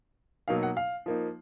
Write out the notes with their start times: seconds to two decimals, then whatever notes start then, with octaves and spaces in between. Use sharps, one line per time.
0.48 B2 F#3 A#3 D#4 F5
0.63 F#5
0.77 F5
1.06 F3 A#3 D#4